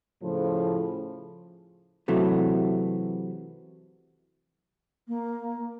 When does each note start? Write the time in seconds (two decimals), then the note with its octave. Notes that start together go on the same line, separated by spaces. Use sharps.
0.22 A2 C#3 F3
2.08 C3 E3 F#3 A3
5.08 A#3